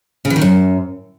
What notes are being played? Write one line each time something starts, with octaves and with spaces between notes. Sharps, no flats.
C#3
E3
D#3
F#2